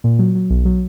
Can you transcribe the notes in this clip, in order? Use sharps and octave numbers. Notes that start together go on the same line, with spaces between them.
A#2
F#3
F#3
B1
F#3